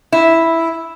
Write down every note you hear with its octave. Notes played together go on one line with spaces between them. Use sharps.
E4